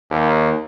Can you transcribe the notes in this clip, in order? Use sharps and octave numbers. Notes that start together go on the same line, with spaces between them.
D#2